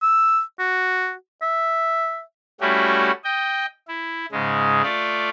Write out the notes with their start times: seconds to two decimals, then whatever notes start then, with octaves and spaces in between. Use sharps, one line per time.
0.02 E6
0.59 F#4
1.42 E5
2.61 G3 A3 C#4 E4 F#4 G4
3.24 D#5 G5
3.88 E4
4.32 G#2 C#3 G#3
4.83 A3 F4 D5